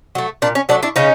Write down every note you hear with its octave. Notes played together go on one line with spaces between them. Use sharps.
F#3 A3
A#2 D4
C#4
F#3 A3 D4
D4 E4
C#3 C#4 D#4